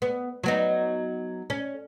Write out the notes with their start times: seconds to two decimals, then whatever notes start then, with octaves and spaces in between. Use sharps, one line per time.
0.02 B3
0.44 F#3 B3 D#4
1.50 C#4